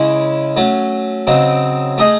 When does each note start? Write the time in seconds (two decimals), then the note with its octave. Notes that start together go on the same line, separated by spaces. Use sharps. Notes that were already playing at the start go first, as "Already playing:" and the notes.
Already playing: C#3 G#3 C#4 E4
0.56 F#3 A3 C#4
1.27 C#3 F#3 C4 D#4
1.98 A3 D#4 G#4 D#5